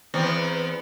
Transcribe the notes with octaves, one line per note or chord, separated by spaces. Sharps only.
E2 B3 C4